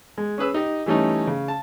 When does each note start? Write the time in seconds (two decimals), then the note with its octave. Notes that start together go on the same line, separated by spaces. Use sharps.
0.18 G#3
0.38 C#4 G#4 B4 E6
0.54 D#4 G4 D#5
0.86 E3 G3 A3 C#4 D#4
1.27 C#3
1.48 A5